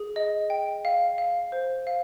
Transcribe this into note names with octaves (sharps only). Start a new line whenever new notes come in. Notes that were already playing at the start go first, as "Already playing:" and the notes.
Already playing: G#4
D#5
G5
F5
F5
C5
F5